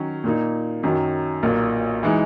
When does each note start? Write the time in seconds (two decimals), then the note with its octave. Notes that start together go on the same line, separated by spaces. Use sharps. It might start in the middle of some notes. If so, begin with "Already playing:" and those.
Already playing: D#3 F#3 C#4
0.24 A#2 A#3 D#4
0.83 F#2 D#3 F#3
1.43 B1 A#2 A#3
2.03 E3 G#3 D#4